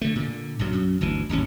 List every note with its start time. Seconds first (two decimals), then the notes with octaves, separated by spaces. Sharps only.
0.01 D3 A3
0.15 A#2 D3
0.59 A#1 G2 F#3
0.73 F#2
1.01 G1 D2 E3
1.29 D1 G#1 D#2 C#4